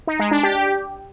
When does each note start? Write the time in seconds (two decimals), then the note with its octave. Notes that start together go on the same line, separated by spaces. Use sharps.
0.07 D#4
0.19 G#3
0.31 D4
0.43 G4